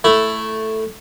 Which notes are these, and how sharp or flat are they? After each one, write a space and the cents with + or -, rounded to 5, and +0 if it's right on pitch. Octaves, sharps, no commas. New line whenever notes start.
A3 +0 E4 +5